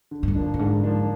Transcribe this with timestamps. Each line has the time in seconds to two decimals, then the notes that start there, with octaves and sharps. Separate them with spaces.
0.11 D3
0.23 G2
0.28 F2
0.35 F3 A#3 D4
0.54 G2
0.59 G#2 D3
0.84 F3 A#3 D4